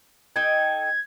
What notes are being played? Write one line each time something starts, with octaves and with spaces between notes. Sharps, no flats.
D#4 A4 G5 G#6